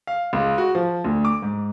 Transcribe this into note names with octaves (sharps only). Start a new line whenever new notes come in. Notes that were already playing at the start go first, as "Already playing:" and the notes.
F5
C#2
F#4
F3
D2
D6
G#2